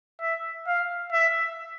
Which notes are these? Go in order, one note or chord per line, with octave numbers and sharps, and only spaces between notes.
E5
F5
E5